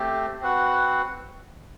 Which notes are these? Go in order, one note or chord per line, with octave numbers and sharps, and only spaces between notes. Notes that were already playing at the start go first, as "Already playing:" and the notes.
Already playing: A3 C4 G4
C4 F#4 B4 F#5